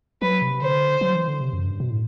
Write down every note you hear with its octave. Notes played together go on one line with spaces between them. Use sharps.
F#3 B4
C3
D3 C5
F#3
E3
D3
C3
F#2
G2
B2
A2